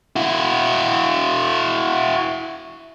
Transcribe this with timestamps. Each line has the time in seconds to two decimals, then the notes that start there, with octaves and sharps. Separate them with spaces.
0.16 E4 F#4